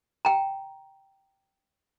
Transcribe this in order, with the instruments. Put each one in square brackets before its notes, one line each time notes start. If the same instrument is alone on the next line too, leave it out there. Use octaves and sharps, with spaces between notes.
[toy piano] G5 A#5